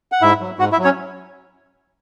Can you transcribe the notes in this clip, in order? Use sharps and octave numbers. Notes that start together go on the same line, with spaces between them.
F#5
G#2 E4 E5
F#3
G#2 F#4 F#5
E4 E5
F#3
C#4 C#5